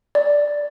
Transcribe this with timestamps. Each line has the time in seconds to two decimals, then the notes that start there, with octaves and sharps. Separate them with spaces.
0.15 D5